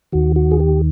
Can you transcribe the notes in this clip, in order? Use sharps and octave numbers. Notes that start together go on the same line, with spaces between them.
D#2 D#3 F#4
F#4
G#4
G4